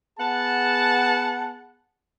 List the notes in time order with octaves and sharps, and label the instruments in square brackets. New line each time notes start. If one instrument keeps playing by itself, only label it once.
[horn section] B3 G#4 F#5 A5